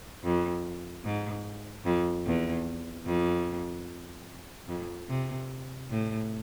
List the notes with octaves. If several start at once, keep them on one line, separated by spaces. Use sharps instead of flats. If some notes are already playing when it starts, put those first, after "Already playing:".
F2
G#2
F2
E2
F2
F2
C3
A2